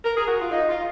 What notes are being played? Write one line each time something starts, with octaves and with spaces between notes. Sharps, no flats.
A#4
G#4
F#4
F4
D#4
F4